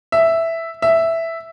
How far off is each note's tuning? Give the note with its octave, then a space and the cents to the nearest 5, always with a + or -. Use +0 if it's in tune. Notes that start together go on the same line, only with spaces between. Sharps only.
E5 +0
E5 +0